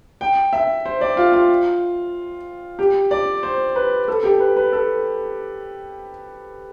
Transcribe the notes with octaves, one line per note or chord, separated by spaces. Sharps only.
G5
E5
C5
D5
F4
F4
G4
D5
C5
B4
A4
G4
B4
B4
A4